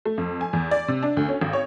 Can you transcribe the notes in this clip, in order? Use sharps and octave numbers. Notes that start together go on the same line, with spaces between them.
A3
F2
G#5
E2
D5
C3
D4
D2
C#4
G#1
C#5